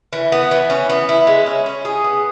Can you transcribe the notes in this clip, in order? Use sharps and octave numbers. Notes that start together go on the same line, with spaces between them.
E3
B3
E3
C#4
B3
E4
G#3
C#4
C#4
G#4
B3